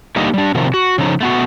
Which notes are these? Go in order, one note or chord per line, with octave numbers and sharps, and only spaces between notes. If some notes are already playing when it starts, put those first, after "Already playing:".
D3 G3 A#3 D#4 G4 D#5
G3 D4
C3 D#3 F3
F#4
C#3 F3 D#4
A3 B3 F#4